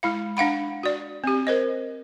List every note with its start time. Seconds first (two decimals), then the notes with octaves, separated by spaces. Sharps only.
0.03 G#3 E4 F5
0.37 D4 F5 F#5 B5
0.83 F#4 D5
1.24 C4 G4
1.47 A#4 C5 D#5